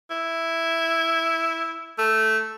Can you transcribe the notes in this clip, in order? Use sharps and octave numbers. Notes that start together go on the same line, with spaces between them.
E4
A3